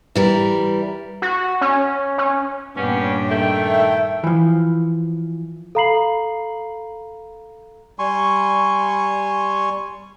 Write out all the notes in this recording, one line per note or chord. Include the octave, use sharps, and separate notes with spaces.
E3 G3 A#4
F#4
C#4
C#4
G2 A#2 B3 C#4 D4 G4
D#3 A3 E5 G5
E3 F3
A4 F5 A#5 B5 C7 F#7
G3 G#5 C6 C#6